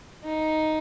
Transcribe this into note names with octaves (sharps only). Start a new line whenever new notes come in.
D#4